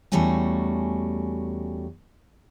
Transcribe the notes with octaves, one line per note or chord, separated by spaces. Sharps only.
E2 G3 A3 C#4 F#4 G#5